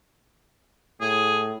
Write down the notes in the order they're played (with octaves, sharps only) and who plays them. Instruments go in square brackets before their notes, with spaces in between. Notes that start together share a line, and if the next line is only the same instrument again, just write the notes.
[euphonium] A2 [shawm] G#4